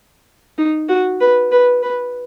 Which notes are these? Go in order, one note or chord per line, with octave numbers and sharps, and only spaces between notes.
D#4
F#4
B4
B4
B4